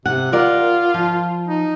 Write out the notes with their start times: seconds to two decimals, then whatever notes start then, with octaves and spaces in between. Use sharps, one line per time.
0.06 C3 F#5
0.32 F4 A#4 D5 F#5
0.94 F3
1.48 D#4